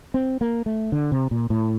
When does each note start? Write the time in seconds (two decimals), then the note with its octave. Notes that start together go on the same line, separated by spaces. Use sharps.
0.14 C4
0.41 A#3
0.66 A3
0.92 D3
1.12 C3
1.31 A#2
1.50 A2